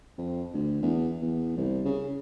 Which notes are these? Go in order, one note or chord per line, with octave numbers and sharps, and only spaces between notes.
F2
D2
E2
E2
C2
C#3